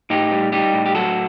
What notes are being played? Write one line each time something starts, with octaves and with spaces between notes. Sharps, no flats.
A2 D#4 G4
G3
G3 D#4 G4
A2
G4
F#3 F#4 A4